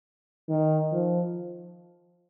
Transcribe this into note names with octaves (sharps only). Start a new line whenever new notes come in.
D#3
F3